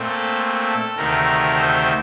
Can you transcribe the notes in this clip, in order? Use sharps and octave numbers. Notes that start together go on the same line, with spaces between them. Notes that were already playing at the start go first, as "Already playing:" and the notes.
Already playing: A#2 A3 C4
A4
A4
D2 C3 D#3 A3 A#4
C5